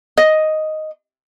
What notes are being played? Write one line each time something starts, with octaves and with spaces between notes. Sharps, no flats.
D#5